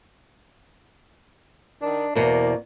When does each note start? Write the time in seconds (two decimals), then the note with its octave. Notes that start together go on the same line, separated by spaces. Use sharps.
1.82 D#3 D4
2.15 E2 B2 A#3 B4 C5 D5